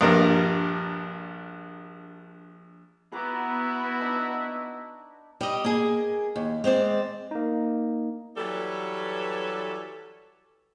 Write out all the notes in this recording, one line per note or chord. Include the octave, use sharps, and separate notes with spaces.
A#1 G2 A#4
B3 E4 F#4 B4 A#5 D6
D4 D#4 A5
G3 D5 D#5
A#3 G#4
D#2
G#3 C4 C5 D5
A#3 D#4
E3 F#3 G3 A4 B4 C#5